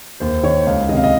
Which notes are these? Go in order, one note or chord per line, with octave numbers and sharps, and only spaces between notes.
D#2 C5
D#3 C#5
C#2 F5
C3 D#3 D#5
F5
D#5